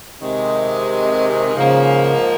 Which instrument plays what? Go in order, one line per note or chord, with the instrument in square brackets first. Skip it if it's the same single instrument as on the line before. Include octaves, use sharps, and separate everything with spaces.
[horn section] C3 D#3 G#3
[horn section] G#2 F3 A#3 [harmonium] C#3